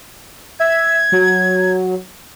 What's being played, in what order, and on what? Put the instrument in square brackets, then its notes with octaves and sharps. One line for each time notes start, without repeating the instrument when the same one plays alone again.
[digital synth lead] E5 [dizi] G#6
[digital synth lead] F#3